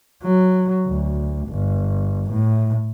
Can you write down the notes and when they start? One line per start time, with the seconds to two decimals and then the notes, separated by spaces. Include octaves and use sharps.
0.24 F#3
0.87 D2
1.49 G1
2.31 A2